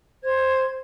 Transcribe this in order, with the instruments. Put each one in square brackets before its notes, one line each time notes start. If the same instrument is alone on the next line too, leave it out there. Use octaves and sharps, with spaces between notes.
[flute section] C5 G#6